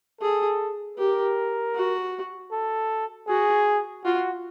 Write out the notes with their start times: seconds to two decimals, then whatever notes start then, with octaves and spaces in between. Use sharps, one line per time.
0.21 G#4 A4
0.98 G4 A#4
1.75 F#4
2.52 A4
3.28 F#4 G#4
4.04 F4 F#4